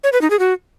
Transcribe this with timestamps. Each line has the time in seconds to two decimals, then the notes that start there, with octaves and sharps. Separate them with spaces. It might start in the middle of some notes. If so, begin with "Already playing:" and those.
0.04 C#5
0.13 B4
0.21 D#4
0.30 G#4
0.39 F#4